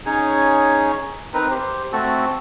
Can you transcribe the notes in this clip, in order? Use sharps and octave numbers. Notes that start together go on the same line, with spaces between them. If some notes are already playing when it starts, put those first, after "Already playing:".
C#4 D#4 G#4 C#5
C4 D#4 A#4 B4
G4 C5
A3 C4 F#4 A4